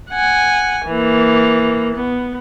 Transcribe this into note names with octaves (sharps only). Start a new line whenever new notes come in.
F#5 G#5
E3 A#3
B3